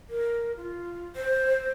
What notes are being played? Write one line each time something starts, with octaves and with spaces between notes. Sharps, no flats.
A#4
F4
C5